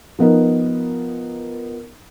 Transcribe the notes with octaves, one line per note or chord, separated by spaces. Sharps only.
F3 B3 D#4 A#4